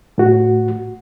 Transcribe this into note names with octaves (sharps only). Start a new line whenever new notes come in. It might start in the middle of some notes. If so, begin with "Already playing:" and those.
A2 F#4